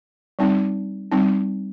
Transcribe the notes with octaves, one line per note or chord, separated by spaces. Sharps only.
G3 C4 D#4
G3 C4 D#4